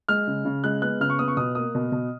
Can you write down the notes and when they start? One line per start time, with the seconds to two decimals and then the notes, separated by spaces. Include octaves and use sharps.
0.09 G#3 F6
0.27 C#3
0.45 C#3
0.64 G#3 F#6
0.82 B3 F#6
1.01 C#3 F6
1.10 C#6
1.19 B3 D#6
1.28 C#6
1.37 B2 D#6
1.55 A#3 D#6
1.75 B2
1.92 B2